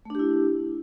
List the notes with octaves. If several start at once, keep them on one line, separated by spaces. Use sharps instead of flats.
A3 D4 E4 G4